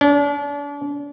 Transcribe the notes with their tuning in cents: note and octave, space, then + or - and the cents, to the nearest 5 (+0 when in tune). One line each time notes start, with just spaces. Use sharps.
D4 -40